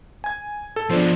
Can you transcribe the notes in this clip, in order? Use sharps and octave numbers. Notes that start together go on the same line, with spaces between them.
G#5 G#6
A4
B2 F3 D4 C5